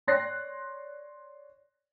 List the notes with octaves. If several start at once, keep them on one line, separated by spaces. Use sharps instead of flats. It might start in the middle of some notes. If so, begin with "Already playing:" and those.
C#5 D5 C6 F#6 A#6 C7